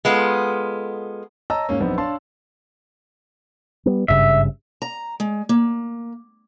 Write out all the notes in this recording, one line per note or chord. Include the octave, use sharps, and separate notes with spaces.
G#3 B3 F4 A4
C#5 D#5 A5 A#5 E6
G#2 A#3 C#4
A#1 F#2 B3 C4 D#4
D4 C#5 F5 A5 C6
G3 B3
G#1 G2 C#3 E5
A#5
G#3
A#3